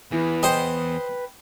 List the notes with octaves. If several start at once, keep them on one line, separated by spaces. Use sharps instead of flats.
E2 E3 B4
C5 D#5 G5